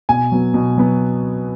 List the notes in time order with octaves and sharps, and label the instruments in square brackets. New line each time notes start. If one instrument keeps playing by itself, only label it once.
[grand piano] B2 G#5
F#3 B3
B2
F#3 B3